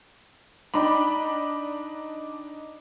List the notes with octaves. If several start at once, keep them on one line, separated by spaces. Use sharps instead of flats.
D4 D#4 D5 G5 B5